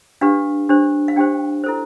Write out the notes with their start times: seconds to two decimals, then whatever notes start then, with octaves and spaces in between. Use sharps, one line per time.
0.21 D4 G4 B4 F5
0.69 D4 G4 C5
1.08 F5
1.16 D4 G4 C5 G5
1.64 E4 A4 C5